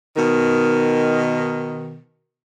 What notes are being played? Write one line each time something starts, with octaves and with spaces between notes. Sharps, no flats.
B2 D#3